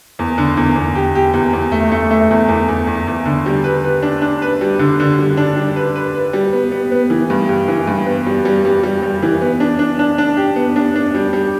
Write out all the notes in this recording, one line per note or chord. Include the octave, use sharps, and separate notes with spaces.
E2
D3
E2
E2
G4
G4
E2
E2
A3
A3
A3
E2
E2
E2
E2
E2
D3
G3
B4
B4
D4
D4
B4
G3
D3
D3
G3
D4
G3
B4
B4
B4
G3
B3
B3
B3
E3
G2
G2
E3
G2
B3
G3
G3
G3
G3
G3
E3
B3
D4
D4
D4
D4
G4
B3
D4
D4
G3
G3